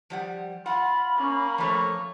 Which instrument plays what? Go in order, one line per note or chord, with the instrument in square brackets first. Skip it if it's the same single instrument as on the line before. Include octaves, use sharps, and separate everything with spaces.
[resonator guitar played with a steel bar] F3 G3 F#5
[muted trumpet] F4 [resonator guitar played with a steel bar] F#5 [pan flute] B5
[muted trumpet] A#3 [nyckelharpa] C#4
[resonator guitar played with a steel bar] F3 A3 A4 [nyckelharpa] C#5